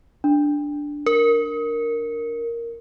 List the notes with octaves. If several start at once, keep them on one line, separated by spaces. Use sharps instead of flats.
D4
A#4